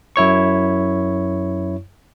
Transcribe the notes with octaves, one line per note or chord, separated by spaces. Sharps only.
F#2 E4 C#5 C#6